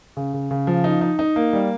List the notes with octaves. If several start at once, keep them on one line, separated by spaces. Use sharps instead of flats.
C#3
C#3
C#3
F3
D#4
D#4
D#4
A#3
G3